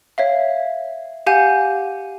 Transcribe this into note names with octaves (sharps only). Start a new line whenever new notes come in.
C#5 E5 F5
G4 F5 F#5 G#5 G6 D#7